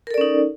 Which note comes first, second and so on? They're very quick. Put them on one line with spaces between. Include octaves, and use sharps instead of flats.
A#4 A4 D5 C#4 D#4